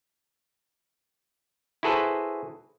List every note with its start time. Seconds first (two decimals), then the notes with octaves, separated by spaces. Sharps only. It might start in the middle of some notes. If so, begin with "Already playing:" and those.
1.83 E4 F#4 G#4 A4 B4 C5